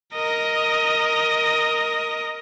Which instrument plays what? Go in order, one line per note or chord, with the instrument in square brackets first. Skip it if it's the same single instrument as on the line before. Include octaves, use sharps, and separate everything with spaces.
[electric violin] A#4 D#5